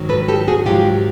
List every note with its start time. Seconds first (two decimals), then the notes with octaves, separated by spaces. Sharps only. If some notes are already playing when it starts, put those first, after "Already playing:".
Already playing: G#2 D#3 F#3
0.09 A4 B4
0.28 G4 A4
0.48 F#4 G#4
0.66 G#2 D#3 F#3 F4 G4